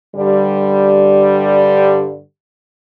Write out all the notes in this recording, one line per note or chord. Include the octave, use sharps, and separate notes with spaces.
G2 D3 G3